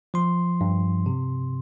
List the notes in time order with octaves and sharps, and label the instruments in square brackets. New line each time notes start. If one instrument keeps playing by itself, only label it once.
[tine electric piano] F3 C6
G2
C3